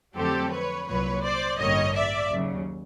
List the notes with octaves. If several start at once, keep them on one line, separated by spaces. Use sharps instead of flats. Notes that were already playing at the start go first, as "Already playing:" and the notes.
F2 D3 F#3 A3 C4 G4 A4
B4 C#5
C2 A#2 F#3 B4 C#5
C5 D5
A1 G2 D3 G3 A#3 C#5 D#5
D5 E5
D#2 C#3 F#3